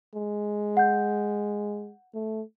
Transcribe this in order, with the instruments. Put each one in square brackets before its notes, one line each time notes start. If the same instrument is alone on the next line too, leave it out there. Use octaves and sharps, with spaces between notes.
[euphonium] G#3
[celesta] F#5 G6
[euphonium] A3